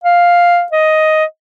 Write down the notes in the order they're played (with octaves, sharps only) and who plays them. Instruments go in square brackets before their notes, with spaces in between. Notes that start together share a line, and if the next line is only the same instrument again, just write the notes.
[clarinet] F5
D#5